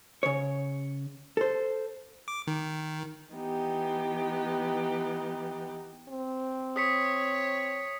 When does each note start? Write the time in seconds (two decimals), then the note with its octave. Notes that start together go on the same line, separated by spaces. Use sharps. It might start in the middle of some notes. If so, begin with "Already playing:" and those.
0.23 C#3 C#5
1.37 A4 C5
2.28 D6
2.47 D#3
3.32 E3 B3 D#4 G4
6.08 C4
6.76 C#5 D#6 B6 C#7